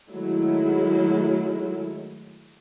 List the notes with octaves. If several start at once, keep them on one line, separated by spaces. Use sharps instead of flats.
D#3 F#3 G#3 A3 E4